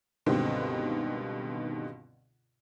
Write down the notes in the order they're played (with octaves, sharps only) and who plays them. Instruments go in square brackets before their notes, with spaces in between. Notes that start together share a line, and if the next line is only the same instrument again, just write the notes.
[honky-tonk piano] C#2 G2 B2 D3 D#3 C4